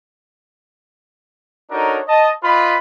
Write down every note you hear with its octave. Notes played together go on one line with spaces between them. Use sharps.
D4 D#4 F#4 A4 A#4 C#5
D#5 A5
F4 B4 D#5 B5